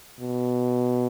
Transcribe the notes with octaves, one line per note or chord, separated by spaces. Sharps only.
B2